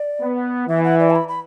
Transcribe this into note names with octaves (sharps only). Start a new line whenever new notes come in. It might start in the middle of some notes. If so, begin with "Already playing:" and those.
Already playing: D5
B3
E3 E5
F#5
D5
A5
B5
B5